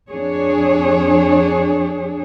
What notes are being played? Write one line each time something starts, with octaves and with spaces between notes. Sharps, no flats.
F2 D4 G#4 C#5